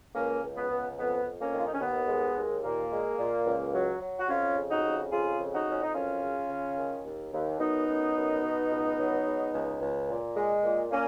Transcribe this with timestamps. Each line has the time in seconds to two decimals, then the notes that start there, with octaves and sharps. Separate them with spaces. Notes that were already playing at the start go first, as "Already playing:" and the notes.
0.14 C#2 A#3 C#4
0.42 C#2
0.56 B3
0.70 C#2
0.98 F2 B3
1.25 F2
1.39 A#3 C#4
1.53 D#3
1.58 F4
1.66 D#4
1.74 C#4
1.81 D#2 B3
2.08 G#3
2.35 D#2
2.63 A#2 A#3
2.91 G#3
3.18 A#2
3.46 C#2
3.73 F#3
4.01 F#3
4.19 F#4
4.29 F2 C#4 F4
4.56 C#3
4.69 D#4 F#4
4.84 F2
5.11 C#3 F4 G#4
5.39 F2
5.53 D#4 F#4
5.67 F2 C#4
5.82 D#4
5.94 F#2 C#4 F4
6.22 C#3
6.50 C#3
6.77 D#3
7.04 D#2
7.32 D#2
7.59 F#2 B3 D#4
7.87 F#2
8.15 F#2
8.43 B2
8.71 C#2
8.98 F#3
9.26 G#3
9.53 C#2
9.81 C#2
10.08 A#2
10.35 G#3
10.63 A#2
10.90 A#2 A#3 C#4